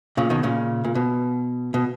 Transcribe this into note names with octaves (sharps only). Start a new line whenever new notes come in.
A#2 C#3
B2 D#3
A#2 C#3
A#2
B2
B2